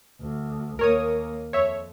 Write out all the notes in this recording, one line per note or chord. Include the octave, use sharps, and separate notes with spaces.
D2
D#2 A#3 A#4 C#5 D#6
F2 C#5 E5